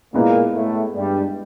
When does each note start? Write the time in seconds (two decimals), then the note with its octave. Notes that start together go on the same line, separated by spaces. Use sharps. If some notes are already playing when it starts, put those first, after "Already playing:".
0.14 A#2 G#3 A#3 B3 E4
0.54 A2 A3
0.95 G2 G3